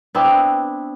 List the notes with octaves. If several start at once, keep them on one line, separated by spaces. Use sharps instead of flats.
B3 C4 D4 E4